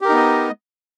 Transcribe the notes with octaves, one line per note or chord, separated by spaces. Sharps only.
B3 D#4 G4 A#4 D#5